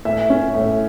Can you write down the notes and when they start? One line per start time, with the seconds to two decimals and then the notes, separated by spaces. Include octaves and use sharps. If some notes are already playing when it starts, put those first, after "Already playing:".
0.05 A2 E5
0.30 C#4
0.54 A2